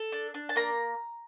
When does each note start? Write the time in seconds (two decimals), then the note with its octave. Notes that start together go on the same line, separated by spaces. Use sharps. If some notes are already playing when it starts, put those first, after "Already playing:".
Already playing: A4
0.12 D4
0.34 D4
0.49 A5
0.56 A#3 A#5